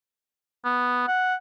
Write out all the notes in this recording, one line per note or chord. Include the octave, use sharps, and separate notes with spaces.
B3
F#5